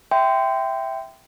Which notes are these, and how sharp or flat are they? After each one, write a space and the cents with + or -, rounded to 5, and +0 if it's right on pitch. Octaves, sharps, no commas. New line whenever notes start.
E5 +0 G5 +0 C6 -25